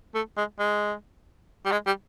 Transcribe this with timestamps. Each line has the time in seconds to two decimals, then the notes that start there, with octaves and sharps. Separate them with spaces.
0.15 A3
0.37 G#3
0.59 G#3
1.65 G3
1.72 G#3
1.87 G3